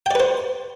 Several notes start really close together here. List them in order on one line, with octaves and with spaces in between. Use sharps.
G5 D5 B4 C5